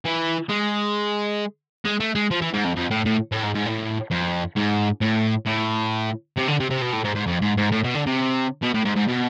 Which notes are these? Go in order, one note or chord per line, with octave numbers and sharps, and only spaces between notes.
E3
G#3
G#3
A3
G#3
F3
E3
G#2
F2
F2
A2
A2
A2
G#2
G#2
A2
F2
G#2
A2
A2
C3
D3
C3
C3
B2
A2
G#2
G#2
F2
G#2
G#2
A2
B2
D3
C3
B2
A2
G#2
G#2
B2